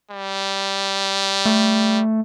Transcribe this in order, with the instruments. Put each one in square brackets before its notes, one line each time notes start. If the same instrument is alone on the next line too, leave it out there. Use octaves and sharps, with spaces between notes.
[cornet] G3
[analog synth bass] A3